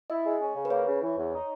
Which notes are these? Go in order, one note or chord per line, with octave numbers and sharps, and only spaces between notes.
E4 D#5
G#3
C#4
C#3
B4
A#3 C#5
C#3
E3
E2
D#4